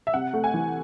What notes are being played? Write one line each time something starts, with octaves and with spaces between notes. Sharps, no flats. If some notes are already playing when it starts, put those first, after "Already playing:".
E5
C3 F#5
A3
G#5
E3